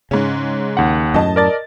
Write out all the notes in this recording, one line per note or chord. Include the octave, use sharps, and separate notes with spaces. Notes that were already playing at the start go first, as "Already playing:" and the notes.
G#2 C#3 C#4
D#2 F#5
F#2 A2 D#5 A5
A#4 D5 A6